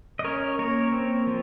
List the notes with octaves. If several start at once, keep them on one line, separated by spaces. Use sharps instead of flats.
D#5
C#4 A#4 C#5
A#3 A#4 C#5
C4
F3